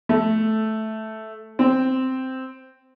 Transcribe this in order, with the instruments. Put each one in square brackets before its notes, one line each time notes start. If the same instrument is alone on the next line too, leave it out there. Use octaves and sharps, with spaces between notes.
[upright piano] A3
C4